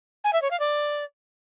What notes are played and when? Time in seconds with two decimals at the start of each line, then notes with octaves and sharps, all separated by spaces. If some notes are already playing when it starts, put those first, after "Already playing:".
0.24 G#5
0.33 E5
0.42 C#5
0.51 F5
0.59 D5